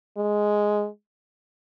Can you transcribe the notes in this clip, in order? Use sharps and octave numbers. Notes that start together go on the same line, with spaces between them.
G#3